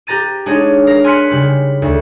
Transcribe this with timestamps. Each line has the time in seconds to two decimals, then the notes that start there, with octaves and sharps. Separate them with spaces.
0.07 G4 B4 A#5 A6 D#7
0.46 G#3 D4 D#4 G#4 C#5
0.87 A#4 F5
1.04 G#5 C6 F6 F#6 B6 C#7
1.30 C#3 G3 B5
1.82 D2